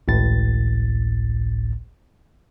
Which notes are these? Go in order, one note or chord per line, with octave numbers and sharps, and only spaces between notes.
G#1 C#2 A2 A6